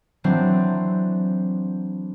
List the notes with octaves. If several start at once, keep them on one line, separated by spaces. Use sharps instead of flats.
E3 F#3 C4 D4